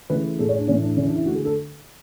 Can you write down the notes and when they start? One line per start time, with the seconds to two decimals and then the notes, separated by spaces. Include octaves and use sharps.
0.10 C#3 E3 A3 B4
0.39 A2 G#3 A4
0.49 C#5
0.58 D4
0.67 A2 E3 A3 C#4
0.82 D4
0.97 C#3 E3 G#3 C#4
1.07 D4
1.16 E4
1.26 D3 A3 F#4
1.35 G#4
1.45 A4